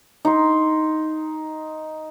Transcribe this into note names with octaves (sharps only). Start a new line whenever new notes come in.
D#4 C6